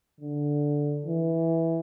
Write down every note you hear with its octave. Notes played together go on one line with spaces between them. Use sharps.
D3
E3